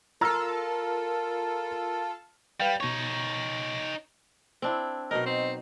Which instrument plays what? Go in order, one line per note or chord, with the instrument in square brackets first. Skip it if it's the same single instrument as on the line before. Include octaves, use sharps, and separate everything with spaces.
[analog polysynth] F4 A4 [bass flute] A#4 [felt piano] A#5 E6 F6
[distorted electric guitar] G3 [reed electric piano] B4 F5 G5
[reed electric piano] B2 C#6 [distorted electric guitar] D#4 C#5
[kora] C4 D4 E4
[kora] B2 F#3 D#4 [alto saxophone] A#4
[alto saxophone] C4